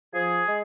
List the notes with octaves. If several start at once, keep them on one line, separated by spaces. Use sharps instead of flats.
F3 G#4
G#3